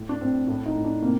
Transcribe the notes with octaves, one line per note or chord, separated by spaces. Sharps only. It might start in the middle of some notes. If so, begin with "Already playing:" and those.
Already playing: A2
D4
A2 C4
A2 D4
D#4
A2
D4
C3 A#3